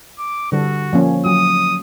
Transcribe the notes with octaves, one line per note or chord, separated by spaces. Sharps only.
D6
D3 G3 F#4 A4
F3 A#3 C#4
F#3 D#6